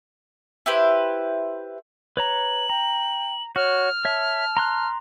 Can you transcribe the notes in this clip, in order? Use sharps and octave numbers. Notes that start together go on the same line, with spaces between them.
E4 G4 B4 C5
B4 C#5 A#5 F#7
G5 A#5
F#4 C#5 F6
C#5 E5 A5
A#5 C6 F#6